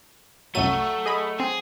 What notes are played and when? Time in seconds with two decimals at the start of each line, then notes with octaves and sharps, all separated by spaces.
0.55 C2 F#2 F#3 A3 D#7
1.06 G#4 D#5 B5
1.40 C4 G#4